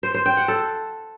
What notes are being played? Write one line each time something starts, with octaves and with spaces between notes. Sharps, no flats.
C5
C5
G5
F#5
A4